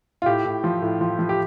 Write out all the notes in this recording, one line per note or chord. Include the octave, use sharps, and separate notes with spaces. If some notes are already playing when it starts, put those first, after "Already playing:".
F4
A2 G4
A2
F3
A2
F3
F3
G4